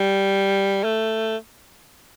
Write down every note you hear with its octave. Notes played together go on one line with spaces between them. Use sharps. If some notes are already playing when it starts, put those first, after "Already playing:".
Already playing: G3
A3